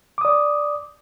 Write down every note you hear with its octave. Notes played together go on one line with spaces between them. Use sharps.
D5 D6 D#6